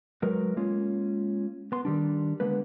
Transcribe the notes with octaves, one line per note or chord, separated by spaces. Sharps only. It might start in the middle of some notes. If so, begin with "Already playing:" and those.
F#3 G#3 F#4 A#4 B4
G#3 A#3 C#4 F4
B3 C6
D#3 G3 D4
D3 G#3 A#3 B3 B4